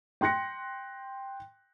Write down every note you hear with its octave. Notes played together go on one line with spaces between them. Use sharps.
G5 C6 F#6 A#6 C#7